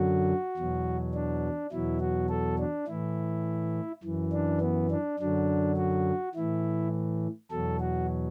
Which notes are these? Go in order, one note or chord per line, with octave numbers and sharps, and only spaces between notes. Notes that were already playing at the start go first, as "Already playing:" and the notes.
Already playing: F#2 D3 F#3 F#4
E2 B2 F#3
D4
E2 B2 F#3 E4
F#4
A4
D4
A2 E3 E4
F#2 E3
D4
B3
D4
F#2 D3 F#3 D4
F#4
A2 E3 E4
E2 B2 F#3 A4
F#4